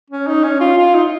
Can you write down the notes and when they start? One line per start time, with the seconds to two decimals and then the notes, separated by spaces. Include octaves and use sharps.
0.10 C#4
0.27 D#4
0.44 C#4
0.61 F4
0.78 F4
0.94 D#4